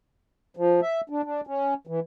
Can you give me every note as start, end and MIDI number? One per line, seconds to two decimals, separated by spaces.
0.57 0.80 53
0.82 1.01 76
1.10 1.22 62
1.24 1.41 62
1.47 1.74 61
1.87 2.00 52